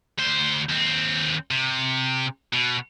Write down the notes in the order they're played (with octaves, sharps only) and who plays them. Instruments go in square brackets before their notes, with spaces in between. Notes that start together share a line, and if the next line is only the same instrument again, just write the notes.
[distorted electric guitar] D2 C5
D#2 C4
C3
B2